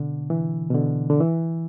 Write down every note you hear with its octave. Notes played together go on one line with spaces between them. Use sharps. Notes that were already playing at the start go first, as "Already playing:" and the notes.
Already playing: B2 D3
E3
B2
D3
D3
E3